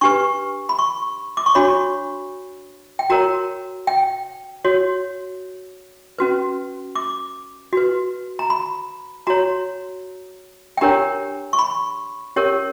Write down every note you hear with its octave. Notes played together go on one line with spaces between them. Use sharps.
D4 G4 B4 C#6
B5
C#6
D6
C#6
D4 F#4 C#5 B5
G5
F#4 A#4 C#5 A#5
G5
F#4 C#5
C#4 F#4 B4
D6
F#4 B4
A#5
B5
F#4 C#5 A#5
G5
D4 G4 A#4 C#5 A#5
C#6
B5
C#4 G4 A#4 C#5